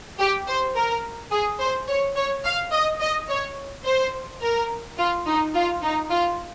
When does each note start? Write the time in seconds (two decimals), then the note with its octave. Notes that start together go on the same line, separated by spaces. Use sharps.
0.19 G4
0.47 C5
0.75 A#4
1.31 G#4
1.59 C5
1.88 C#5
2.16 C#5
2.44 F5
2.72 D#5
3.00 D#5
3.29 C#5
3.85 C5
4.41 A#4
4.98 F4
5.27 D#4
5.54 F4
5.82 D#4
6.11 F4